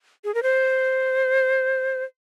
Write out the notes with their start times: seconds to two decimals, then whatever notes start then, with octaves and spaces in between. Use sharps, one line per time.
0.24 G#4
0.34 A#4
0.43 C5